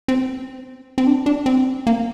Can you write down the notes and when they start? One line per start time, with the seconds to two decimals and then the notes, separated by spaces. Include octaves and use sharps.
0.08 C4
0.98 C4
1.07 D4
1.26 D4
1.46 C4
1.87 A#3